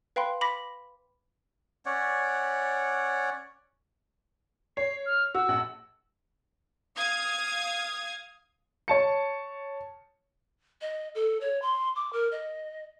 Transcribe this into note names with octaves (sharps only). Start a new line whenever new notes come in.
B4 F5 G5 B5 C6
B5 D6 A#6 B6
C#4 C#5 D5 F#5
C#5 C7
F6
F#4 E6
A#1 F#5
F5 D#6 G#6
C#5 A5 C#7
D#5
A4
C#5
C6
D6
A#4
D#5